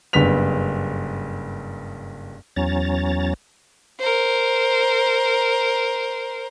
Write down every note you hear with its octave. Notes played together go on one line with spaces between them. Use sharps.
F#1 G2 B3 B6 F7
E2 F#3 C#4 A#5 A6
A#4 C5